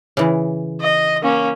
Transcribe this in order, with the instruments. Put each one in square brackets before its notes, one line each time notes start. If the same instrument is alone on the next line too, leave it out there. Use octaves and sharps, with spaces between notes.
[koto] C#3 E3
[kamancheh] D#5
A#3 C#4